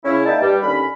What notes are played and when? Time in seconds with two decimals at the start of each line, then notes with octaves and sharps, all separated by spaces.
0.05 C#3 C#4 E4
0.25 A#3 D#4 D5 E5 G5 A5
0.41 G2 G3
0.62 D#2 D3 C#4 B5